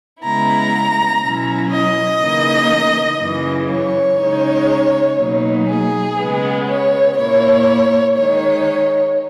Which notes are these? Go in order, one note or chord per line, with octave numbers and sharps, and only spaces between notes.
C#3 G#3 B3 E4 A#5
B2 F#3 C#4 E4
D#5
C#3 E3 A#3 D#4
F#2 C#3 E3
C#5
C#3 G#3 D#4
B2 F#3 A#3 D#4
G#4
C#3 G#3 B3
C#5
A#2 A#3 E4 C#5
D#3 G#3 D#4 C#5